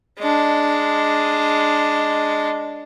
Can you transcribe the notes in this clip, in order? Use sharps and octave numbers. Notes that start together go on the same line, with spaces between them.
G#3 D4